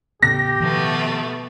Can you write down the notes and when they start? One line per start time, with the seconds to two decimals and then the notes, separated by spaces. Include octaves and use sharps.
0.22 A2 C#3 B3 G4 A#6
0.60 B2 D#3 F3 A3 B3